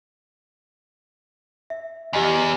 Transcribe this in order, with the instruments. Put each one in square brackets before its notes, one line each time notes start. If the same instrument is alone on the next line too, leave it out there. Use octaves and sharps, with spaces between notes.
[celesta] E5
[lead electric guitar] E2 [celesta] G4 D#5 G#5